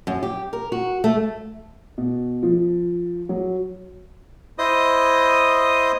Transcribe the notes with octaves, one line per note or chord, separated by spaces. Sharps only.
F#2
G4
A#4
F#4
A3
B2
F3
F#3
E4 C5 D#5 D#6